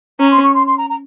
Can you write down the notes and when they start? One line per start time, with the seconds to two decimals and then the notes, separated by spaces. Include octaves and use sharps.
0.19 C#4 A#5
0.30 C6
0.43 C#6
0.54 C6
0.66 C6
0.78 A#5
0.89 A#5